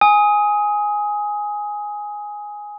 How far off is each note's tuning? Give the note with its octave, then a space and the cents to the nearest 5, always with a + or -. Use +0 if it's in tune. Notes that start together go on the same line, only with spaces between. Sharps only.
G#5 +0 D#6 +20